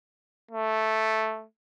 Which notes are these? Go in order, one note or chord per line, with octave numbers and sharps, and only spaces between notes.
A3